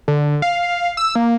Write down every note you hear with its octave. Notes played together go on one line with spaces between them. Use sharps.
D3
F5
E6
A#3